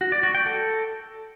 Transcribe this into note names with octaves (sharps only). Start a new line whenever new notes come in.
F#4
D5
F#4
G5
A4